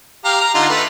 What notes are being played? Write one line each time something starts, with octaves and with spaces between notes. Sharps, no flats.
G4 F5 A#5
A#5
D3 D#4 F4
A3 B4